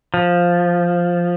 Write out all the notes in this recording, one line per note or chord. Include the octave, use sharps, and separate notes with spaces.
F3